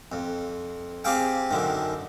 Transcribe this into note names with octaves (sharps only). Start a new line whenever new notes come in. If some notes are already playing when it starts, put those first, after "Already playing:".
F2
C4 G4 G#4 F5 G5
F#2 D3 D#3